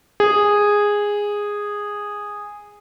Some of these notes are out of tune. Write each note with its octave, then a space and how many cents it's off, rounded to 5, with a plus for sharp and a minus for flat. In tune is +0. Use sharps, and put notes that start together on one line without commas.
G#4 -10